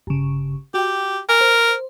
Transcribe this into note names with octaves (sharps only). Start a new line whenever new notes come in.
G1 C#3
F#4 G4 G5
A#4 G#5
C5